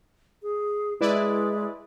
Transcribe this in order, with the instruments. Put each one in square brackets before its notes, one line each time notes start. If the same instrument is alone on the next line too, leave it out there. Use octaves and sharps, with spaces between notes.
[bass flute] G#4
[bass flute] G#3 [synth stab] E4 B4 D5